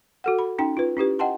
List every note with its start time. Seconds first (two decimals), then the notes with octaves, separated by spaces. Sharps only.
0.24 F#4 A4 F#5
0.39 B5
0.59 C#4 D#4 G5
0.77 F4 B4
0.97 C#4 E4 G4 B4
1.19 D#5 F#5 G5 A5 C6